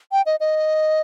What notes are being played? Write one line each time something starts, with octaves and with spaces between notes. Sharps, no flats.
G5
D#5
D#5